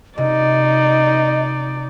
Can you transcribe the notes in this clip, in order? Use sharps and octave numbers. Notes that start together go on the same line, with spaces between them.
C3 D#4 D5 D#5